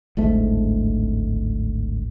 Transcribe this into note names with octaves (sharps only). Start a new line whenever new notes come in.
D1 G#1 G#2 A3